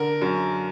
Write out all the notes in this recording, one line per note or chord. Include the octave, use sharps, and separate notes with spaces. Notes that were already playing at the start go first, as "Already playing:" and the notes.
Already playing: D3 A#4
F#2